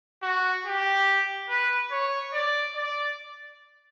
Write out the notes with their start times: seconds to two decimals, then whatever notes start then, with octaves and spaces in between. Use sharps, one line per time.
0.23 F#4
0.66 G4
1.50 B4
1.91 C#5
2.33 D5
2.75 D5